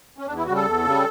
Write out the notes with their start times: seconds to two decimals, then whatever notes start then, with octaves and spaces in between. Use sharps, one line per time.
0.18 C#4
0.27 E2 D4
0.37 E4
0.46 C#3 G3 F#4
0.56 A4
0.66 E2
0.85 C#3 G3